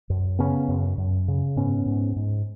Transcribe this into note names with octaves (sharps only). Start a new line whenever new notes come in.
F#2
C#3 B3 C#4
F#2
F#2
C#3
G#2 B3 C#4
G#2
G#2